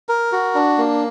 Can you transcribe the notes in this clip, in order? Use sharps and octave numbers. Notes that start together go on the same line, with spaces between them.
A#4
F#4
D4
A#3